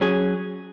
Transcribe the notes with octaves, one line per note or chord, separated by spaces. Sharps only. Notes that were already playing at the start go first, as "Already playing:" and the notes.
F#3 C#4 G#4